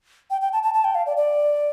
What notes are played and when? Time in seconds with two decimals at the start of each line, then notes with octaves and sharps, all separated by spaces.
0.30 G5
0.41 G5
0.53 A5
0.63 A5
0.74 A5
0.84 G5
0.95 F5
1.06 D5
1.17 D5